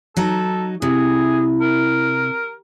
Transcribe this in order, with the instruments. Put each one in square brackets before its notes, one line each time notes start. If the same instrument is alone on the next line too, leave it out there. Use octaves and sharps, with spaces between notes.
[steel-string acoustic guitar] F#3 D#4 [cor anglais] A4
[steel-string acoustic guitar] C3 [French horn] E4 [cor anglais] G#4
[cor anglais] A#4